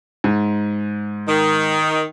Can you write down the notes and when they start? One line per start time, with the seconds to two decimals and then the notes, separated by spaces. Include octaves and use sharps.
0.24 G#2
1.28 D#3